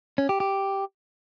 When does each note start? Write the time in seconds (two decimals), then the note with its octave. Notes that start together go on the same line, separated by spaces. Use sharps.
0.18 C#4
0.29 G4
0.40 G4